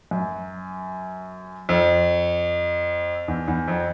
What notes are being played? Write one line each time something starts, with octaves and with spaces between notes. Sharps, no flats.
F#2
F2
E2
E2
F2